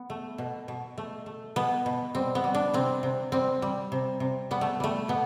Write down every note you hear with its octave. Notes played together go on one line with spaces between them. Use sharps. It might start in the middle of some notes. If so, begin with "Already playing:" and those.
Already playing: B3
A3
B2
B2
A3
A3
B2 B3
B2
G3 C4
B3
G3
D4
C3 C4
C3
G3 C4
G3
C3
C3
G3 B3
A3
G3 A3
B2 B3